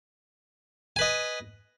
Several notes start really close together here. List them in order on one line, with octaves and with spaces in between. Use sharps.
G#5 B4 D#5